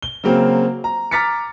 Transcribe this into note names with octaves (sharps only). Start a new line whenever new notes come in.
G7
C#3 F#3 A#3 C4
A#5
A#5 D6 F6 A6 B6 C#7